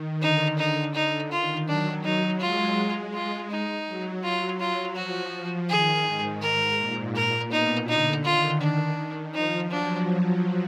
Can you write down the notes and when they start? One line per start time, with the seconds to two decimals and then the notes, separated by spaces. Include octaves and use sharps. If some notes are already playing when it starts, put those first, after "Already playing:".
Already playing: D#3
0.22 D3 D#4
0.59 D#4
0.95 D#4
1.31 D#3 F4
1.67 F#3 D4
2.04 F#3 D#4
2.40 G#3 F4
2.77 G#3
3.14 F4
3.50 D#4
3.87 F#3
4.23 F#3 F4
4.60 F#3 F4
4.96 F3 F#4
5.33 F3
5.69 D#3 G#4
6.06 G#2
6.42 G#2 A#4
6.79 A#2
7.15 A#4
7.51 B2 D#4
7.88 D3 D#4
8.24 D#3 F4
8.61 D4
9.34 F3 D#4
9.70 F#3 D4